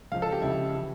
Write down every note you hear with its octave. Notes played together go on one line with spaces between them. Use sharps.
C#2 C#3 F3 F5
A4
G4
C#2 C#3 F3 E4
E3